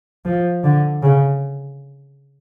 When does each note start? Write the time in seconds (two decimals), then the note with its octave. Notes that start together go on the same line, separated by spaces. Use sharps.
0.25 F3
0.64 D3
1.02 C#3